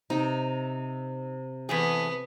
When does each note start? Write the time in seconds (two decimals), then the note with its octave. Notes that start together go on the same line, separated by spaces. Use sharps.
0.10 C3 D#4 G5
1.69 E2 A3 B3 G#4